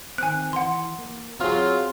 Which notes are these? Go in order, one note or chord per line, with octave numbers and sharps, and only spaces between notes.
D#3 C4 G#5 F#6
E3 F#5 C6
A#3
F#3 C4 F4 G#4